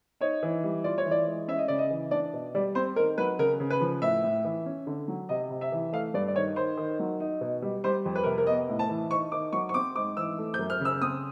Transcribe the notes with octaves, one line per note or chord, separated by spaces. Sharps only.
D#4 C#5
E3
G3
F4 D5
C#5
E3
D5
G#3
C#4 E5
D#5
C#3 D5
D#5
E3
D4 D5
B2
G3 D5
C4 C5
D#3 A#4
F#3 B4
C#3 A#4
C#3
B4
F3
A2 E5
A2
E3
C#4
D3
F#3
C3 D#5
C3
E5
E3
A3 F5
G2 D5
D5
D#3 C#5
D#3 C5
D#3
F#3
D#4
B2
G3
G3 C5
F2
B4
C3 A#4
A#4
B3 D#5
A2
A5
E3
D#4 C#6
D#3 D6
F#3 C#6
C#6
C4 D6
G#2 D6
E3 E6
A3
G6
F#2
F6
C#3 E6
C4 D#6